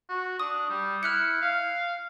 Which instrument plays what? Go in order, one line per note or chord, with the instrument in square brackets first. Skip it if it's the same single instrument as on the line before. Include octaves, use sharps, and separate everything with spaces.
[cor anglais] F#4
[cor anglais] D4 [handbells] D#6
[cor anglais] G3
[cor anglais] E4 [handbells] F6 F#6 C#7
[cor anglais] F5